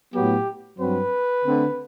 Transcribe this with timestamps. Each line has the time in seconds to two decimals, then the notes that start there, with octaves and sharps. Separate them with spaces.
0.14 A2 F#3 B3 G4
0.78 G2 F#3 C4 B4
1.42 D3 A3 C4